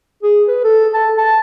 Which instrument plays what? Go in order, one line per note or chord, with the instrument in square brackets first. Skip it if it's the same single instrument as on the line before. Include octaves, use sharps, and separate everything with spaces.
[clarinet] G#4
B4
A4
A5
A5